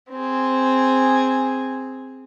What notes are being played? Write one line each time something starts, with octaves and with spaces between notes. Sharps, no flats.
C4 G#4